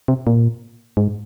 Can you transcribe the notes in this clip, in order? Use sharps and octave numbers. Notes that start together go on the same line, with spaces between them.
C3
A#2
G#2